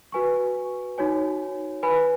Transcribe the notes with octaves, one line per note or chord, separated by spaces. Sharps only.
F#4 B4 G#5 C#6
D#4 F#4 C#5 G#5
B4 G#5 B5